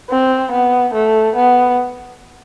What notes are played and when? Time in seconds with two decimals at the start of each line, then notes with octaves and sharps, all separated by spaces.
0.10 C4
0.52 B3
0.94 A3
1.35 B3